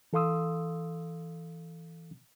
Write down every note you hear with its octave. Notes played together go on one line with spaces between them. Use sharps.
E3 A4 F5 C6 D#6 E6